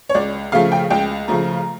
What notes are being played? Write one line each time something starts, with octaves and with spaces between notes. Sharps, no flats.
C#5
C#2 D5
C#3 F3 A3 F5
G5
C#2 G5
C#3 F3 A3 A#5